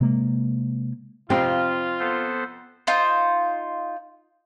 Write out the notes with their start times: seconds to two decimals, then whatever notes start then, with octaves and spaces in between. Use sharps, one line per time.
0.01 C3 G#3 A#3
1.30 F2 C3 C4 F4
2.00 B3 A4 C5
2.87 D#4 F4 C5